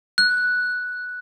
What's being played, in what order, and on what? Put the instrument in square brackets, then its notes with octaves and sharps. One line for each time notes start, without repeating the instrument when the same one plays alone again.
[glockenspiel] F#6